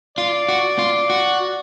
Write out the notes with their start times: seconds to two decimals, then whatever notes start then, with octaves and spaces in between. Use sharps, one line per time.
0.17 F4 D5
0.49 F#4
0.79 F4
1.10 F#4